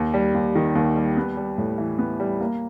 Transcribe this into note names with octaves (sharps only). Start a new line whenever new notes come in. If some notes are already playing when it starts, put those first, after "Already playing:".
Already playing: D#2
G3
D#2
D#3
D#2
G3
B3
G3
A2
E3
B3
G3
A#3